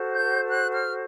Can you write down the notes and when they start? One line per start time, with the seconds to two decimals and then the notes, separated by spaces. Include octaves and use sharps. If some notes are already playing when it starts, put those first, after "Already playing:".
Already playing: F#4 A4 C5
0.12 G6
0.49 F#6
0.74 F6